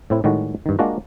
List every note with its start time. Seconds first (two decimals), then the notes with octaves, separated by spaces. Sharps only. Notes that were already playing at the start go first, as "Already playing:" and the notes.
0.10 A2 C4 E4
0.24 A2 D#3 G3 G#3 F#4
0.66 G2 D#3
0.79 G#3 A#3 D4 F4 F#4 A#4